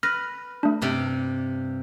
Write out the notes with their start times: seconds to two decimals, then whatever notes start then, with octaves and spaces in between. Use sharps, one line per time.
0.03 B4 F6 A#6
0.63 A3 D4
0.82 G2 C3 D5